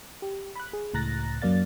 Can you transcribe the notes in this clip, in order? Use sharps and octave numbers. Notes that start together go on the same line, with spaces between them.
G4
B5 F#6
G#4
C#2 A2 A#5 F#6 A6 A#6
F#2 F#3 A#3 D5 F5 A6